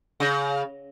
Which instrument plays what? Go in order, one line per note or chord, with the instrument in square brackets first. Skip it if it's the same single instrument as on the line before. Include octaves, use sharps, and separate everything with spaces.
[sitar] C#3